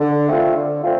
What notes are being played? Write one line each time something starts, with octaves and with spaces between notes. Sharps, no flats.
D3
A3 C4 F4
D3
A3 C4 F4